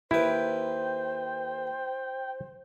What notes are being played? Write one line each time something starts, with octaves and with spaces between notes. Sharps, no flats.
D#2 E4 B4 C5 G5